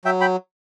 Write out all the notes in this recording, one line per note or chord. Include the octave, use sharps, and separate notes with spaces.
F#3 E5 G5
G5 B5